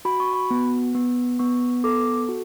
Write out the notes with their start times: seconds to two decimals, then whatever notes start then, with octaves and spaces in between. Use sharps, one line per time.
0.05 F#4 B5
0.20 C#6
0.33 B5
0.51 B3
0.95 B3
1.39 B3 C#6
1.84 A4 D6
2.29 F#4